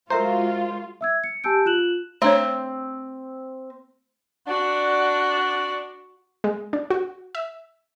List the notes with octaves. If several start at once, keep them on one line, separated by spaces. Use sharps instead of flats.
G#3 F4 F#4 A#4 C5 E5 A#5
E5 E6 G#6
C#7
G4 G#5 A5 E6 G6 D7
F4 F#6 E7 F#7
A3 C4 D4 C#5
D4 F#4
G#3
D4
F#4
E5